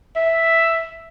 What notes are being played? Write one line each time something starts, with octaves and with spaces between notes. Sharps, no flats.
E5